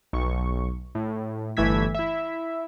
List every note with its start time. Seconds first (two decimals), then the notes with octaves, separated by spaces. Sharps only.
0.13 B1 C#6
0.95 A2
1.57 G1 E3 A3 E6 G#6 B6
1.95 E4 E5